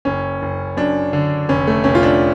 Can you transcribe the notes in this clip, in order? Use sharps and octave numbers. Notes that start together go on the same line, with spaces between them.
F#1 C#4
F#1
F#2 D4
D3
F1 C#4
A3
F1 C#4
F4
D4